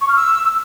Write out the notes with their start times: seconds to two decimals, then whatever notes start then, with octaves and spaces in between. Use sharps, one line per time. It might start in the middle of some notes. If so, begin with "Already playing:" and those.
0.01 C#6
0.08 F6
0.16 E6